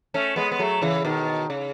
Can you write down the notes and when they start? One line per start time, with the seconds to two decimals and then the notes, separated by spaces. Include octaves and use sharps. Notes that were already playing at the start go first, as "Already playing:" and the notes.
0.14 A3 C#4
0.36 G#3 B3
0.52 B3
0.59 F#3 A3
0.82 C#3 E3
1.05 B2 D#3
1.50 C#3